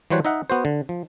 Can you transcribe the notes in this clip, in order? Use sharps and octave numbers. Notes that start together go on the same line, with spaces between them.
E3 F#3 G3 C5 C#5 F#5
D#4 D#5 E5 F#5
B3 F#4 C5
D3
F3